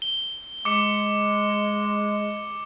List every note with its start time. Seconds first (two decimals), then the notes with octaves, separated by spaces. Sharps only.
0.02 G7
0.65 G#3 D6 C#7